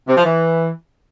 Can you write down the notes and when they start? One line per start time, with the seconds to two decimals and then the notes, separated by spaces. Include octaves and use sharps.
0.08 C3
0.16 F3
0.25 E3